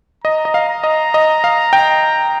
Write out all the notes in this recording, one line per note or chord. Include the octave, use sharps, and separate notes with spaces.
D#5 A#5
D#5
F5
A#5
D#5
D#5
F5
G5